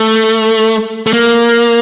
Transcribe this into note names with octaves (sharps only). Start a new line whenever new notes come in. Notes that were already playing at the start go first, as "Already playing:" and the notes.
Already playing: A3
A3
A#3